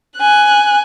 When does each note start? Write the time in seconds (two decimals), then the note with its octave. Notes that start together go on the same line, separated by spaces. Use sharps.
0.18 G#5 F#6